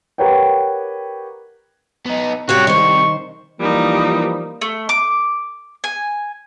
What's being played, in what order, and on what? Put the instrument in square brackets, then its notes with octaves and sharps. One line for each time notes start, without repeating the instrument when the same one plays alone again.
[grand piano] G4 A#4 B4 C#5 F#5 G5
[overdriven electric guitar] B3 D#4
[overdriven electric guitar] C3 G3 [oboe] F#4 [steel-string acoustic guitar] G4 C#5 F5
[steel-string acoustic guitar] D#3 C5 [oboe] C#6
[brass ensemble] E3 F3 A#3 [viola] G3 D#4
[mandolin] A3
D6
G#5